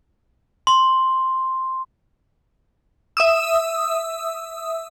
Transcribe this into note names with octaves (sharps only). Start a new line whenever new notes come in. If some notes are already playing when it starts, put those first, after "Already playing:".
C6
E5 D#6 E6